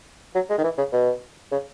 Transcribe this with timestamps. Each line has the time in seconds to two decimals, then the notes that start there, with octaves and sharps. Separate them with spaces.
0.35 F#3
0.49 G#3
0.58 D#3
0.64 E3
0.78 C#3
0.93 B2
1.52 C#3